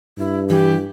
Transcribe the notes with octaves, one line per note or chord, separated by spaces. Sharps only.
G2 E4
E3 E4 F#4 G4